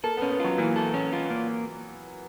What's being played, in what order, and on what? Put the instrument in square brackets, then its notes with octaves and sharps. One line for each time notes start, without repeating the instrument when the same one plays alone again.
[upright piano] A#3 [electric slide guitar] A4
[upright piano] B3
[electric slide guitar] C#4
[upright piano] B3
[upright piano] F#3 [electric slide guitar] F4
[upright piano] E3 [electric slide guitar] A#3
[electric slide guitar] A4
C#4
F4
A#3